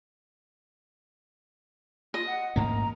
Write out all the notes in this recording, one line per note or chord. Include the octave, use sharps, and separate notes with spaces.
F4 D#5
F#5
A1 G#2 A#3 A#5